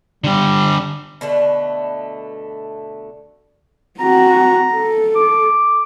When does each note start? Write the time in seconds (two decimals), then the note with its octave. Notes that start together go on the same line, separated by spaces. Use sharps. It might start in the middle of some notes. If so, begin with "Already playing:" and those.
0.24 D3 G3 G4
1.21 B2 D3 A3 B4
3.99 C4 F#4 A#5
4.74 A4
5.15 D6